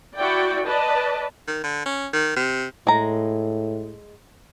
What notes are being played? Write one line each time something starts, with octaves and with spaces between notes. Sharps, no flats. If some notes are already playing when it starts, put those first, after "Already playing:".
E4 F#4 D5 G5
B4 D5 D#5 A5
D#3
D3
C#4
D#3
C3
A2 G#3 A#5